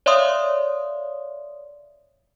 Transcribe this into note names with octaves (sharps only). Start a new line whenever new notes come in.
C#5 D5 E5 F5 C6 D#6